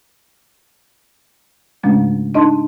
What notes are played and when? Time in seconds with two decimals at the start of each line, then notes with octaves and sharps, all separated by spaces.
1.83 G#2 C#3 G#3 A3 C#4 D4
2.34 D4 D#4 D#5 A5 C6